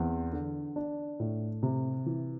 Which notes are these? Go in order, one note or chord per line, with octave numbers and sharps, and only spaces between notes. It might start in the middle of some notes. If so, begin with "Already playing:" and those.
Already playing: E2 C4
D3
D4
A2
C3
E3